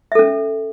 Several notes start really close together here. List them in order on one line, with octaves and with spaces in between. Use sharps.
E5 A4 C#4